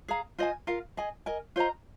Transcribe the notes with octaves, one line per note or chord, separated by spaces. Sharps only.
G#4 F5 A#5
F4 C5 D#5 G#5
F4 A#4 F5
G#4 D#5 G#5
A#4 D#5 G#5
F4 C5 D#5 A#5